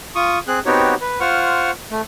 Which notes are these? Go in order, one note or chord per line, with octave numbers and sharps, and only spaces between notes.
F4 C#6 D#6
C4 G#4 F#6
B3 C4 D#4 F#4 G4 C#5
B4
F4 C5 F#5 C#6 F6
A3